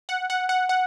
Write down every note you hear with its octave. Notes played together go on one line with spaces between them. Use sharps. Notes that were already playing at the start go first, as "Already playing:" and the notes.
F#5
F#5
F#5
F#5